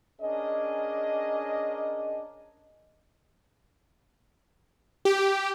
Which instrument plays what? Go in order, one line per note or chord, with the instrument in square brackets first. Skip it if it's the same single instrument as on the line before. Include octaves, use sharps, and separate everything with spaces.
[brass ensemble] C#4 D4 G#4 A#4 D#5
[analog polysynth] G4